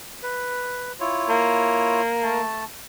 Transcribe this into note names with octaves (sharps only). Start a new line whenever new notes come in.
B4
E4 F4 C#5
A#3
A3 A5